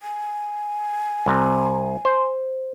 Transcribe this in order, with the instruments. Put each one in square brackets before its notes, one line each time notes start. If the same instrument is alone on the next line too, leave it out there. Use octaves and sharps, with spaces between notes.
[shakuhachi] G#5
[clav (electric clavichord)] C2 C3
C5